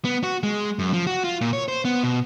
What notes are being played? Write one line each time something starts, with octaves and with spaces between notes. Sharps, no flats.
B3
F#4
G#3
F#2
F3
F#4
F4
A#2
C#5
C5
B3
B2